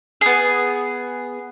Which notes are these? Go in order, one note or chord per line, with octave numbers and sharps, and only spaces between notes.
B3 G#4